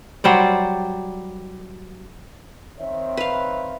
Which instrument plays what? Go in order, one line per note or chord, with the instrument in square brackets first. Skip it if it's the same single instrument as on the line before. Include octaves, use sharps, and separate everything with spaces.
[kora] F#3 G3 C5 D5
[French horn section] D#3 C4 C#5 [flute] E5
[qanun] B4 F5